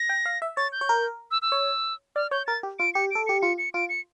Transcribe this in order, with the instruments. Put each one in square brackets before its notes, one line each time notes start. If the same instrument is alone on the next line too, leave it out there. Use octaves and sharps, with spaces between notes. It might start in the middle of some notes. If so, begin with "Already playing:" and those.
Already playing: [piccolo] A#6
[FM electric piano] G5
F5
E5
[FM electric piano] C#5 [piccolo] A6
[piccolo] G6
[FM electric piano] C#5
A#4
[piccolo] E6
E6
[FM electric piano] C#5
[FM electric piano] D5 [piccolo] F6
[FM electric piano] C#5 [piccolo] G6
[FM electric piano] A#4 [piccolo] A6
[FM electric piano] G4
[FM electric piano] F4 [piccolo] D7
[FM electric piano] G4 [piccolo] C#7
[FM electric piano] A4 [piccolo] D7
[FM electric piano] G4 [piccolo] C#7
[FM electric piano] F4 [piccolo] C#7
[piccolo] C#7
[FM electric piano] F4 [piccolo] D7
[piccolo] C#7